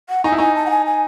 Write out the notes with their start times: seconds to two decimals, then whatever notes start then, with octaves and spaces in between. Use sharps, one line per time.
0.09 F#5
0.24 D#4 G#5
0.32 E4
0.36 D#4 G#5 A5
0.55 A5
0.66 F#5
0.70 G#5
0.86 G#5